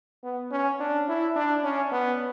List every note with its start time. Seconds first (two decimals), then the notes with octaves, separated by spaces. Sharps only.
0.23 B3
0.51 C#4
0.80 D4
1.08 E4
1.36 D4
1.64 C#4
1.92 B3